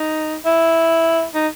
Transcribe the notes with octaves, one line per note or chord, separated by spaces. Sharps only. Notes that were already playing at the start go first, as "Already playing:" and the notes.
Already playing: D#4
E4
D#4